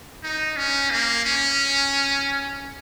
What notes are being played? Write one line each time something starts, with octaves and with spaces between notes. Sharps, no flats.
D#4
C#4
A#3
C#4